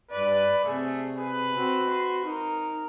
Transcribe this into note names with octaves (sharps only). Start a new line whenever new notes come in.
G2 B4 D5
C3 A3 G#4
G#4 B4
C4 F#4
C6
D#4 A#4